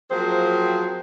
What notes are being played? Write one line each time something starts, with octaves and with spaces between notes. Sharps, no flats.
F3 F#3 A#3 C4 G#4 C5